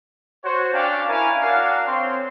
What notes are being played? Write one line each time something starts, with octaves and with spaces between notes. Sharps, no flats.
F#4 C5 C#5
C#4 D4 D5 F5 G5 A5
C#4 E4 A#4 F5 G#5
D4 F#4 A#4 F5
C4 C#5 C6